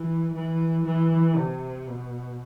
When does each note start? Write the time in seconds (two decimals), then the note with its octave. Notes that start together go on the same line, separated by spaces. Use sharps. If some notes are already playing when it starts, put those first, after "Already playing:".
Already playing: E3
0.35 E3
0.86 E3
1.36 C3
1.87 B2